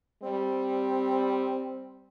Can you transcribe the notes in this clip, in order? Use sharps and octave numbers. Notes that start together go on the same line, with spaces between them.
G3 C4